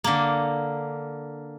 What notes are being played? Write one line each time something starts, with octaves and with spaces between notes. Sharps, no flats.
D3 A#3